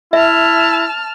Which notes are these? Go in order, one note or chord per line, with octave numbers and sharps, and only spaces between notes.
E4 E5 A5 F6